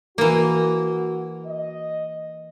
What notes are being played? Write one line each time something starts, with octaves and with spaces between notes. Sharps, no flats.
E3 A#3 F#4
D#5